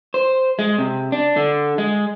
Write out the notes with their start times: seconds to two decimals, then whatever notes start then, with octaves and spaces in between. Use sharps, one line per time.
0.14 C5
0.59 G#3
0.78 C3
1.12 D4
1.37 D3
1.78 G#3